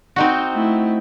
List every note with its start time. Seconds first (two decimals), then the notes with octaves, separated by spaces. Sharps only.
0.16 C4 D#4 F#4
0.53 A3 E4